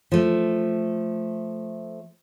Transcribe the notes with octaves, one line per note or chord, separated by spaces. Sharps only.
F3 A3